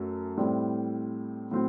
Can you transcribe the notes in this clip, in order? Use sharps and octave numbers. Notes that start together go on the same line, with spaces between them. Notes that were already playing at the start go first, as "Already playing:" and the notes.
Already playing: F#2 A3
A2 G3 C4 E4
A2 F#3 C4